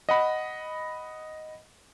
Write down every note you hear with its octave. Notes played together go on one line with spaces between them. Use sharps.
D#5 F#5 B5